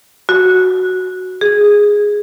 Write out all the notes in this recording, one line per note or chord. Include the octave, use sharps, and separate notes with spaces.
F#4
G#4